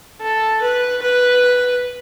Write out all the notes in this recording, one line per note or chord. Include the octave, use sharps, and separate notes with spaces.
A4
B4
B4